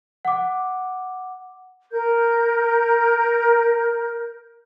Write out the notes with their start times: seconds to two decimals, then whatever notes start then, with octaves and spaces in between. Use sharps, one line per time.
0.25 F#5 D6
1.92 A#4 G6